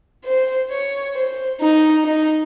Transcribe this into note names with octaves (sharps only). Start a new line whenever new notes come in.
C5
C#5
C5
D#4
D#4